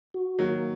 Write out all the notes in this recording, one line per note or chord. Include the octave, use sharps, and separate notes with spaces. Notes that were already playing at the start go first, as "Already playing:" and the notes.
F#4
D#3 F#3 A#3